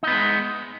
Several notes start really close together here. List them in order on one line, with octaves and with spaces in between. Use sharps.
D#4 B3 G#3